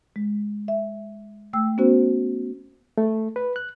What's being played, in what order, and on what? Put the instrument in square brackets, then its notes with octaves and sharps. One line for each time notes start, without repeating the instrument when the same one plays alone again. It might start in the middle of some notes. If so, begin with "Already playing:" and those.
[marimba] G#3
E5
A3 G5 E6
B3 C#4 F#4 C5
[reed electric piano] A3
B4
F#6